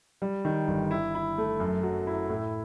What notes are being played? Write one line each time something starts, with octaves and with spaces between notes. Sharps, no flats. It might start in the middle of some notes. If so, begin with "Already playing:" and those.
G3
D#3
G1
E4
E4
A3
F#2
F#3
E4
A2